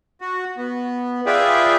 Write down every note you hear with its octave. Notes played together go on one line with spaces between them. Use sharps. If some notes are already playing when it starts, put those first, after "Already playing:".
F#4
B3
F4 G#4 B4 D5 E5 G5